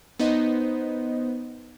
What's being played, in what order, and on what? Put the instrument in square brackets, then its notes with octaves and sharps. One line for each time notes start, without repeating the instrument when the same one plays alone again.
[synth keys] B3 D#4 C5 D#5